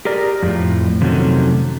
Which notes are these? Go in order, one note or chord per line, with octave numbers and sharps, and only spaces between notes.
G4 G#4 A#4 D5
F2 A2
F2 C3 D#3 F#3 A3 C#4